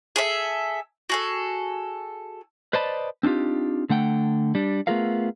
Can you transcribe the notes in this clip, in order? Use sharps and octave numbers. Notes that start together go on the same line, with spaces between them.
G#4 A4 E5
F#4 G#4 A4
B4 C5 D5 D#5 A5 B5
C4 D4 D#4 F4 G4
D3 A3 F#5 G5
G3 D4
A3 B3 F4 G#4 A#4 F5